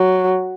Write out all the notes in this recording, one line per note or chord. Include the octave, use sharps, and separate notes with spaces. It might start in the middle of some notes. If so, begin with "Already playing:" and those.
Already playing: F#3